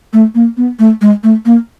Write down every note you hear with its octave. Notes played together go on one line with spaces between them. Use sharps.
A3
A#3
B3
A3
G#3
A3
A#3